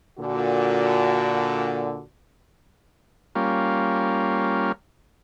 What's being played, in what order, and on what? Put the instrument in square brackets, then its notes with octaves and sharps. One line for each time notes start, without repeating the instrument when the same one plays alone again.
[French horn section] A#2 D3 F#4
[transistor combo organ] G3 A#3 C#4 F4